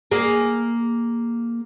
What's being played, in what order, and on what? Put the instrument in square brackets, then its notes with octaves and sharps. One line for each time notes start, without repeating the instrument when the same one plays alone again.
[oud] A#3 G#4